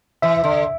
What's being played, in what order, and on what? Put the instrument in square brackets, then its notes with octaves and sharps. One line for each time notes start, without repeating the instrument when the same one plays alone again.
[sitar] E3 [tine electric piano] E5
[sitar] D3